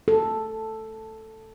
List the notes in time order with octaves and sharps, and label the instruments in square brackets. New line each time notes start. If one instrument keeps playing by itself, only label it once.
[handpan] A4